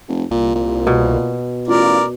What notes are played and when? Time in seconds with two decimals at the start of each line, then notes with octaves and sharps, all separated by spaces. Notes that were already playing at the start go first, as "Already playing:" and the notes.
0.08 F1
0.31 C2 A#2
0.55 A#2
0.87 B2
1.68 A1 F4 A#4 D5